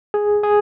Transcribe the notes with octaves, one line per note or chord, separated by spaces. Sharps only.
G#4
G#4